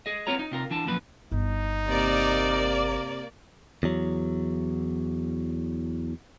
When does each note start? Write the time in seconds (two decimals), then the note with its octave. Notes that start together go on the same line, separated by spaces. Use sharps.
0.06 G#4 D#5
0.27 B3 C4 F4 C#5 A#5
0.39 D#4
0.52 C3 F4 A#4
0.71 E3 D4 A5
0.86 F#2 A#2 F3 B4
1.32 G1 D#4
1.88 C3 A#3 D5
3.83 E2 F#3